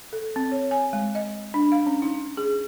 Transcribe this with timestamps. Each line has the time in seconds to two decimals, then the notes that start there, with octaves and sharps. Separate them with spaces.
0.13 A4
0.36 C4
0.52 C#5
0.71 G#5
0.93 G#3
1.15 D#5
1.54 D4
1.72 F5
1.87 C#4
2.02 D#4
2.37 G#4